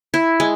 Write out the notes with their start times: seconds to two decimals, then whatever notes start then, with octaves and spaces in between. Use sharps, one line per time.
0.14 E4
0.40 G#3